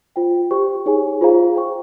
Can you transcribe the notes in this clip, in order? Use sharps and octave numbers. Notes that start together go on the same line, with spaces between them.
F4 C5 G5
G4 C5 G5 C#6
D#4 G#4 C#5 G#5
F4 G#4 C5 F5 A#5
C5 G5 C#6